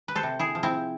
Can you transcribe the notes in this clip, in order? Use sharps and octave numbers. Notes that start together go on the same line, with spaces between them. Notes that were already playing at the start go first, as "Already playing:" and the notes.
B4
A4 C5
C3
E4 G#4
F3
C4 E4